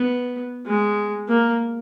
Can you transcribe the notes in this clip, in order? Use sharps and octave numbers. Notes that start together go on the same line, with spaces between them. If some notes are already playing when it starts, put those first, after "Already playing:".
Already playing: B3
G#3
A#3